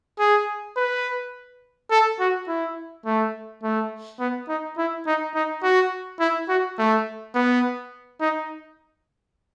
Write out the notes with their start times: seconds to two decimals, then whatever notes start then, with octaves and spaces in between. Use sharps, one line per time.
0.19 G#4
0.76 B4
1.90 A4
2.19 F#4
2.48 E4
3.05 A3
3.63 A3
4.19 B3
4.48 D#4
4.78 E4
5.06 D#4
5.35 D#4
5.63 F#4
6.20 E4
6.49 F#4
6.78 A3
7.35 B3
8.20 D#4